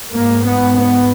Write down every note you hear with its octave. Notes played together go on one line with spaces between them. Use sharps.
G#2 A#3
B3
B3